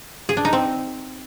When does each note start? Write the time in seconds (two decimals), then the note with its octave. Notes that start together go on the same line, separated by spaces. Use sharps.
0.29 G#4
0.37 D4
0.45 D#4
0.53 C4